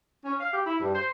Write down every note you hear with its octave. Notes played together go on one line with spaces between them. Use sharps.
C#4
F5
G4
E4
G2
C5